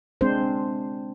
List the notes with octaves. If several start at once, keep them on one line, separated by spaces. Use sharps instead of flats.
G#3 C4 D4 C5